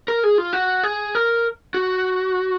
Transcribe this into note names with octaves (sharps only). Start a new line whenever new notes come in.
A#4
G#4
F4
F#4
G#4
A#4
F#4